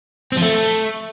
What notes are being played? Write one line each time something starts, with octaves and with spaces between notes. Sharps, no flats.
C4
F3
A3